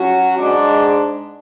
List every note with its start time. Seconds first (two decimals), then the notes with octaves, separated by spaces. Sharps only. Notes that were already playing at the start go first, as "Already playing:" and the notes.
Already playing: F#3 C#4 F#4
0.37 G#2 G#3 D4